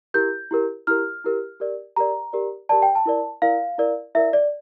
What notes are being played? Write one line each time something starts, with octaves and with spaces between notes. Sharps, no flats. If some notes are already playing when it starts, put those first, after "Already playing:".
E4 G4 A#4 G6
E4 G4 A#4
E4 G4 A#4 F6
E4 G4 A#4
G4 A#4 D5
G4 A#4 D5 A#5
G4 A#4 D5
G4 A#4 D5 A5
G5
A5
E4 A#4 D5
E4 A#4 D5 F5
E4 A#4 D5
E4 A#4 D5 E5
D5